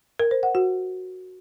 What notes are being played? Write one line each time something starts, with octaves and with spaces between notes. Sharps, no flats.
A#4
C5
F#5
F#4